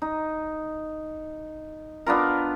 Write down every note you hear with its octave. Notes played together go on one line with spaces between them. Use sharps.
D#4
B3 D4 F4 A#4